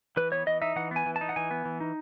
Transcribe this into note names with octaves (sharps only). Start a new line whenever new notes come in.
E3 B4
B3 C#5
E3 D#5
D#4 E5
E3 F#5
B3 G#5
E3
A5
D#4
F#5
E3 G#5
B3
E3
D#4